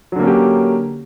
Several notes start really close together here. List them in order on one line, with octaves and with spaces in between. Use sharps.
F#3 D3 A#3 C#4 G4